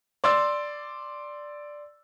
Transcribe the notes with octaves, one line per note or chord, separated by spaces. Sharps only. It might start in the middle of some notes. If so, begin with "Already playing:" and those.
D5 C6 E6 A6